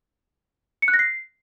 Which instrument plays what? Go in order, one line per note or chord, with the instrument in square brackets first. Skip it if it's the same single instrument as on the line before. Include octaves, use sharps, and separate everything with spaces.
[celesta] C#7
F#6
A#6
C7